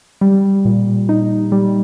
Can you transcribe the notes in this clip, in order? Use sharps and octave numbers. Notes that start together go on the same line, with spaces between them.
G3
A#2
D#4
G3